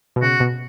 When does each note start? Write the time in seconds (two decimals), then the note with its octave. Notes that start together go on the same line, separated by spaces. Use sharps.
0.16 B2
0.22 C#3 F#4
0.40 B2